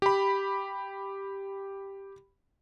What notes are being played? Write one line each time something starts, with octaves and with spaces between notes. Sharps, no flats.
G4 B5